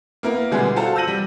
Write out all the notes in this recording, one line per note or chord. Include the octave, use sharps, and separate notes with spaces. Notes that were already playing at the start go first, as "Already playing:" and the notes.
A#3 B3 E4 A#4
B2 D3 G3 G#3 B3 G#4
F4 F#4 A4 C5 A5
E6 G6 A#6 D#7 F#7
G3